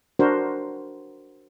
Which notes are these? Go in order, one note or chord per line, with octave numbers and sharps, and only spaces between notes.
D4 F#4 A#4 C5